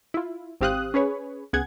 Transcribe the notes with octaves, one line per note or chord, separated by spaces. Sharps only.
E4 F4
G#1 C4 G4 F5 D#6 F#6
C#4 G#4 B4 C#5
C#2 B3 G#4 F#5 G#6